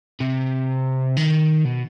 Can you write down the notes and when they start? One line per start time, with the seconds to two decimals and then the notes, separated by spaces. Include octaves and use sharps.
0.20 C3
1.17 D#3
1.65 B2